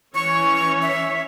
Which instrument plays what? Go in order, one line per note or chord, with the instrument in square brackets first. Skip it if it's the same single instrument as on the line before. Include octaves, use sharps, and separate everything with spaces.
[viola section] E3 C#4 C#5 [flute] C#6
[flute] E5